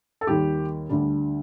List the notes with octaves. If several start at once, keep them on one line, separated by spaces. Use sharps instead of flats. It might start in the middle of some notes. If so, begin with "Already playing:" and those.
A4
D#2 D#3 G3 G4
D2 D3 G3 D4